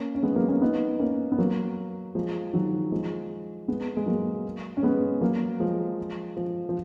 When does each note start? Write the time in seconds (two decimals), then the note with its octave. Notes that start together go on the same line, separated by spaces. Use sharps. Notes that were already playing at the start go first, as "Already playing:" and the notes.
Already playing: A#3 C#4
0.15 C#4
0.23 G#3 B3
0.36 F#3 A#3
0.48 A#3 C#4
0.62 B3 D#4
0.99 A#3 C#4
1.32 B3
1.38 F#3 A#3
2.15 F3 G#3
2.53 D#3 F#3
2.92 F3 G#3
3.68 G#3 B3
3.97 G#3
4.06 F#3 A#3
4.77 C#4
4.83 G#3 B3
5.21 F#3 A#3
5.60 F3 G#3
6.37 F3
6.69 F3